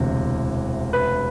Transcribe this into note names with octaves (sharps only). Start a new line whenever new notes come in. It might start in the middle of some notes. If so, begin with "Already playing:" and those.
Already playing: E1 D2 C3 E3
B4